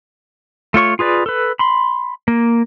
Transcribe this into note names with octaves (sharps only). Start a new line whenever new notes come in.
A3 F4 C#5 C#6
F4 G#4 B4 D5
A4 B4
B5 C6
A#3